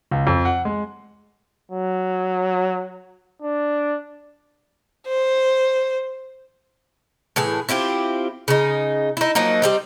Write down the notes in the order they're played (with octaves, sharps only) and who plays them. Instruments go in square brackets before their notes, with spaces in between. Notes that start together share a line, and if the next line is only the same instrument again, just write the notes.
[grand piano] C#2
F2
F#5
G#3
[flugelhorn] F#3
D4
[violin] C5
[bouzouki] A2 E3 G#4
C4 E4 F4 G4
C#3 D#4
D#4 E4
F3 F#3 A#3 D#4
G3 C4 D#4